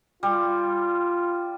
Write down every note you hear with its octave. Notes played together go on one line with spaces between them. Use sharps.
G3 F4